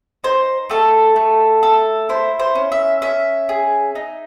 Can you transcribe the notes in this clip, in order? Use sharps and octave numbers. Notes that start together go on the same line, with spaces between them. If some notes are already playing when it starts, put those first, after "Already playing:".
D#4 C5
A3 A4
A3
A4
E4 C5
C5
C#4
E5
C#4 E5
G#4
D#4